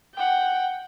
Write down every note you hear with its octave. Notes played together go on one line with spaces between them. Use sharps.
F#5 G5